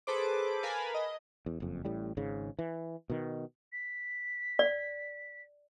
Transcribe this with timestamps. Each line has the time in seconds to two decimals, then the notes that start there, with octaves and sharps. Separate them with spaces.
0.07 G#4 A4 B4 C5 D6
0.63 A#4 B4 F5 G#5 A5 B5
0.94 D#5
1.46 E2
1.60 F#1 F2
1.85 A1 A2 G3
2.17 G#1 G#2 C#3
2.59 E3
3.10 B2 D#3
3.72 B6
4.59 D5